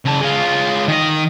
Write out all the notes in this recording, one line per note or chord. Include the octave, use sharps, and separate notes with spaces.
C#3 A5
G#3 F4
D#3 D#5